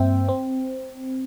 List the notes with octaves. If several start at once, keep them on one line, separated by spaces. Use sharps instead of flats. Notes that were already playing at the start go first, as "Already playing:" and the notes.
Already playing: G2 A#3 C4 E5 G5
C4